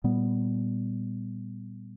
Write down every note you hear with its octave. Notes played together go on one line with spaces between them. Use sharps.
A#2 G3 B3